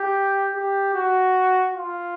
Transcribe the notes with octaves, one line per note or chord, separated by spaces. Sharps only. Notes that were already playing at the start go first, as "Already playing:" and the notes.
Already playing: G4
G4
F#4
F4